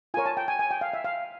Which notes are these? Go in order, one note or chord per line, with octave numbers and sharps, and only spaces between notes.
F4 A#4 C#5 G#5
A5
G5
G#5
G#5
G5
F5
E5
F5